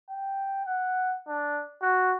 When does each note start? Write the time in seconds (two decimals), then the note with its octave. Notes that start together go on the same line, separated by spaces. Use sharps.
0.10 G5
0.66 F#5
1.28 D4
1.82 F#4